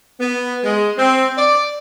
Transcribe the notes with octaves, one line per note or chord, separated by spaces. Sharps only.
B3
G#3
C4
D5